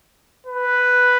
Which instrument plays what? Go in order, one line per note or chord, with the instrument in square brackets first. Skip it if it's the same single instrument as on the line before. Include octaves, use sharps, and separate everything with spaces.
[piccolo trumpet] B4